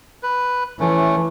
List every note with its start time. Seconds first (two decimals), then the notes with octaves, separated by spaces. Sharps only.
0.23 B4
0.80 E3 A3 C#4